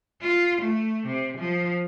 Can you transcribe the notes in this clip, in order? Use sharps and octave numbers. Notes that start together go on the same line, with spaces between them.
F4
A3
C3
F3